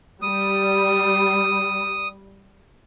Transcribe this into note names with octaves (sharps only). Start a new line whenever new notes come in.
G3 D#6